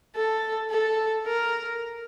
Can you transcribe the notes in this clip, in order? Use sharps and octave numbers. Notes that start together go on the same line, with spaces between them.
A4
A4
A#4